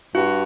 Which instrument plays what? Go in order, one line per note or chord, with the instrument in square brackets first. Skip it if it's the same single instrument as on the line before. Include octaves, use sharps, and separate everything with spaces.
[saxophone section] G2 [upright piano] F#4